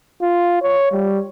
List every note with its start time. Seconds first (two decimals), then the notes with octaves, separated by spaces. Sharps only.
0.22 F4
0.62 C#5
0.92 G3